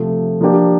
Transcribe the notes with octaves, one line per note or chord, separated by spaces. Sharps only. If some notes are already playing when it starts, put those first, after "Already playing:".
Already playing: C3 F3 A3
F3 A#3 D4 G4